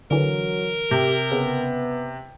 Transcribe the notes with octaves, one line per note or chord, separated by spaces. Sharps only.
D3 E3 F#3 A#4
C3 G4
C#3 B3